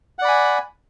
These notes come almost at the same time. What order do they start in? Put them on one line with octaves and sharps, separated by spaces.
F#5 D5 B5 G#5